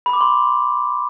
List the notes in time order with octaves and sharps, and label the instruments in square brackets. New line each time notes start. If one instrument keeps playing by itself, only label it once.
[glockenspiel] B5
D6
C6